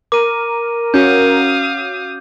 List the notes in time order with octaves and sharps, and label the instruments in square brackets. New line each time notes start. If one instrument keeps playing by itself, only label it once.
[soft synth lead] A#4 [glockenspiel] D6 D#7
[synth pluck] C#4 F#4 [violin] F5 D#6 [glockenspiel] G6